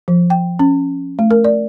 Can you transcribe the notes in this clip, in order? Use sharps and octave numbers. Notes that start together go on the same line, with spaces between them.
F3
G5
C#4
A3
A#4
D5